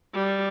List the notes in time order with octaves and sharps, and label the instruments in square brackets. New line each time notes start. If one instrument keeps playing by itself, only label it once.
[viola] G3